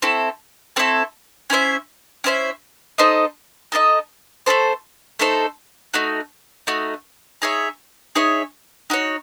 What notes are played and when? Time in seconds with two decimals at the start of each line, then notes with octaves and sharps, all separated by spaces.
0.02 A3 C4 E4 A4
0.76 A3 C4 E4 A4
1.50 C#4 E4 C5 E5
2.24 C#4 E4 C5 E5
2.98 D#4 A4 C5 D#5
3.72 D#4 A4 C5 D#5
4.46 A3 D#4 A4 C5
5.19 A3 D#4 A4 C5
5.94 A3 D#4 F#4
6.67 A3 D#4 F#4
7.42 D#4 G#4 C#5 E5
8.15 D#4 G#4 C#5 E5
8.90 D#4 F#4 C#5